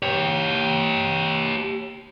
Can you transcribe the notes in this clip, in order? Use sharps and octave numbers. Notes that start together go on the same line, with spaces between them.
G4 C#5